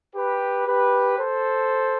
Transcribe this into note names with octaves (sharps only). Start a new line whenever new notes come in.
G4 B4
G4 B4
A4 C5